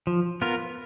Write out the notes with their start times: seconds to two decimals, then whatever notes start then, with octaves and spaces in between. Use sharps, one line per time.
0.07 F3
0.42 B3 F4 A#4